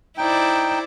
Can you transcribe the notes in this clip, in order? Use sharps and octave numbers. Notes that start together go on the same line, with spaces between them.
D#4 E4 C5 D5 G5